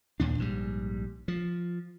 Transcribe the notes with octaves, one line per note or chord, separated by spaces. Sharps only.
D#2 A#2 D4
A#1 G#2 E3 G3
F3